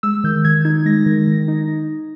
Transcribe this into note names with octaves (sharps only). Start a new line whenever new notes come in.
G#3 E6
D#3 G6
D#3 G#6
D#4 G#6
G#3 A#6
D#3
D#3
D#4